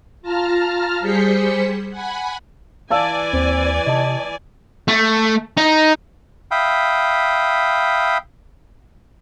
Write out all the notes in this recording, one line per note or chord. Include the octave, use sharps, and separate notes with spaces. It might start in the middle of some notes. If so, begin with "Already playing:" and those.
F4 A5 A#5 F6
G3 G#4 C5 C6 B6 C#7
F#5 G#5 B5
E3 D5 F5 G#5 A5 E6
D#2 C4
C3 D#5 A5
A3
D#4
E5 F5 G5 B5 D#6